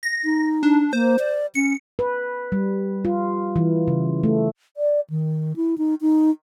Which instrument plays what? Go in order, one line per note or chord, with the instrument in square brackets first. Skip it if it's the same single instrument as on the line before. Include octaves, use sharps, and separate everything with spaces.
[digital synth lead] A#6
[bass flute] D#4
[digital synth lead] D4
[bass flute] A#3 [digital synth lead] C5
[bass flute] D5
[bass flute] C#4 [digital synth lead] C#7
[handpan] B4
G3
F4
E3
C#3
A3
[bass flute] D5
D#3
E4
D#4
D#4